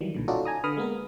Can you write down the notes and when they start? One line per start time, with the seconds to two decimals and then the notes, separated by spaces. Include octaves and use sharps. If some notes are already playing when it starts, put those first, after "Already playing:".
0.01 D#3 E3 F#3 G3
0.15 B1 A#2 D3
0.28 C#4 D#4 F4 F#4 A4 D5
0.45 G#5 A#5 D#6
0.64 D3 B4 B5 D#6 F6
0.77 G#3 A#3 B3 A#4